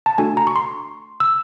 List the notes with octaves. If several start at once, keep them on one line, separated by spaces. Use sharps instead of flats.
A5
A3 D4 F#4 A4 G#5
A#5
C#6
C6
E6